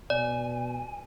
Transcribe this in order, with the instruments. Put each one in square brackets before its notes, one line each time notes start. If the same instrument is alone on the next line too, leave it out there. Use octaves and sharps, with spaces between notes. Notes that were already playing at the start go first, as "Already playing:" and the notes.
[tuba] B2 [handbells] D5 [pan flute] G#5